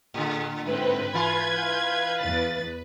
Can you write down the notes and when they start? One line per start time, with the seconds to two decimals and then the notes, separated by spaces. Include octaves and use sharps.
0.14 A2 D3 G#4
0.65 G#2 C4 E4 B4
1.14 E3 F4 B5 G#6
1.59 F5
2.22 E2 A6